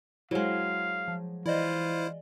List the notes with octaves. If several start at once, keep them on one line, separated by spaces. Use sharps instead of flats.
F#3 G#3 E4 C5 F5
F3
E3 E4 F4 C5 D5 D#5